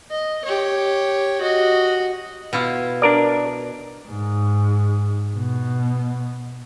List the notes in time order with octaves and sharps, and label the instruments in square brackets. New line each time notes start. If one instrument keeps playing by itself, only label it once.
[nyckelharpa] D#5
G4 C#5
F#4 D#5
[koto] B2 E4 F4
[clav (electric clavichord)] D4 A#4 D5
[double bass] G#2
B2